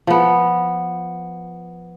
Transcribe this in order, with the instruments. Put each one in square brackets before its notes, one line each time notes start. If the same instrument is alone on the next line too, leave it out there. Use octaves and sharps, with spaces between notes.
[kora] F3 B3